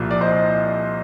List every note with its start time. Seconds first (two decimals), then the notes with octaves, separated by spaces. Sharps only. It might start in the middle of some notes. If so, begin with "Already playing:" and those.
Already playing: C2 A#2 F3
0.11 D5
0.21 C5 D#5